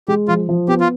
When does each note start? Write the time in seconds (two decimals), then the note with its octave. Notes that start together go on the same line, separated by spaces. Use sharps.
0.08 G#3 G4
0.28 F3 F4
0.49 F3
0.68 B3 G4
0.80 F4